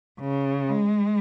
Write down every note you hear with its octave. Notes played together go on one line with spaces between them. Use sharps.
C#3
G#3